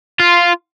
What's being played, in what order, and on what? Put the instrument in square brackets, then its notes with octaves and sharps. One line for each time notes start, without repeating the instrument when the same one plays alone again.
[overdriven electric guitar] F4